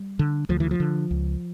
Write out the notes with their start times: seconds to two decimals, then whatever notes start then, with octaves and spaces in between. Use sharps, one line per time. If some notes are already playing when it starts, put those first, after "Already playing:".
Already playing: G3
0.19 D3
0.49 D2 F3
0.60 E3
0.71 F3
0.80 D3
1.11 C#2